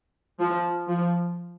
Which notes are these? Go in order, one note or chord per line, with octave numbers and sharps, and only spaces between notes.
F3
F3